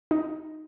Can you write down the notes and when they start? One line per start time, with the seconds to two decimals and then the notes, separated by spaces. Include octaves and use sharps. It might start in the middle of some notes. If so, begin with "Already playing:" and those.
0.11 D#4